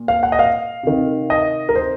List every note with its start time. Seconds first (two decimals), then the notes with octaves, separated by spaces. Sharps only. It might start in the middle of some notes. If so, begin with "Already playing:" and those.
Already playing: A#2
0.08 F5
0.23 F#5
0.32 D#5
0.39 F5
0.83 C3 D#3
1.30 D#5
1.69 A#4
1.76 C5